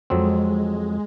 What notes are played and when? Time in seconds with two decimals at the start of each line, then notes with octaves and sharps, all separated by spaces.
0.10 F2 F#3 G#3 C4